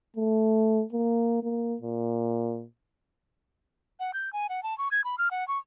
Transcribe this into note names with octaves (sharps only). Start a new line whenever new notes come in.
A3
A#3
A#3
A#2
F#5
G6
G#5
F#5
A5
C#6
G#6
B5
F6
F#5
C#6